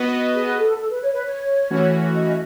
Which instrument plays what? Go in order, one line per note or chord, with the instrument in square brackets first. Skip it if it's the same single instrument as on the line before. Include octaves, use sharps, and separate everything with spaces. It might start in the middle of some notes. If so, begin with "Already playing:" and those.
Already playing: [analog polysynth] B3 F#4 B4 D#5
[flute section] G#4
A4
A4
B4
C#5
B4
C#5
[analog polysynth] E3 A3 C#4 F#4
[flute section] D#5